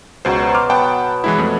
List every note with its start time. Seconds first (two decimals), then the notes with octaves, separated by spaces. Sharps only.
0.25 C#2 B2 F#3 C5
0.54 C6 D6 F6
0.70 B3 F#5 G5 A5
1.24 E3 G#3 E4
1.38 F2 A3